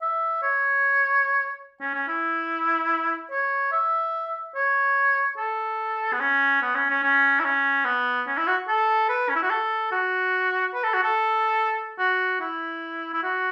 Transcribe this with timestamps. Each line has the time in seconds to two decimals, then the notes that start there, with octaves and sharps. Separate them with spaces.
0.02 E5
0.43 C#5
1.80 C#4
1.94 C#4
2.08 E4
3.32 C#5
3.72 E5
4.55 C#5
5.37 A4
6.13 B3
6.20 C#4
6.62 B3
6.75 C#4
6.90 C#4
7.03 C#4
7.40 E4
7.45 C#4
7.85 B3
8.27 C#4
8.38 E4
8.47 F#4
8.68 A4
9.09 B4
9.29 C#4
9.36 E4
9.43 F#4
9.50 A4
9.92 F#4
10.74 B4
10.83 A4
10.94 F#4
11.03 A4
11.99 F#4
12.40 E4
13.14 E4
13.23 F#4